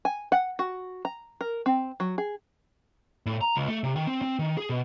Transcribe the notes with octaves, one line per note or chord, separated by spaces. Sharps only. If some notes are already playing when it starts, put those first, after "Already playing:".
G#5
F#5
F#4
A#5
A#4
C4
F#3
G#4
A2
A#5
C#2
A3
C3
D#3
C4
C4
D#3
G#4
B2